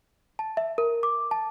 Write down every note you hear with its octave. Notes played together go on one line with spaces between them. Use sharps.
A5
E5
A#4
D6
A5